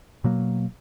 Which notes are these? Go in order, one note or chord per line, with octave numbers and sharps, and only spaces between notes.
B2 F#3 A#3